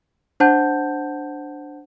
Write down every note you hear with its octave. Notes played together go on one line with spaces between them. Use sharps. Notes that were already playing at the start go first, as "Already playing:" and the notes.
D4 C5 F#5 A5 G6